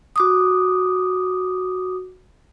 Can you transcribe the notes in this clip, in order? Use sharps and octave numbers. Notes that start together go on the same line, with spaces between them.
F#4 D6 D#6